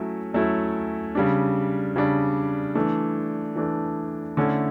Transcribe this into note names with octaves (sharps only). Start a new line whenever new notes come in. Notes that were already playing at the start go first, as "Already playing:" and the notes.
Already playing: F#3 A3 C#4 E4
F#3 A3 C#4 E4
C#3 G3 D4
C#3 G3 D4
E3 A3 D4
E3 A3 D4
D3 A3 C#4 E4